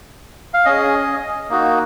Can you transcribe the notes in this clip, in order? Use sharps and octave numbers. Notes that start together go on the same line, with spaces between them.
F5
C#4 G#4 D#5
A#3 D#4 F#4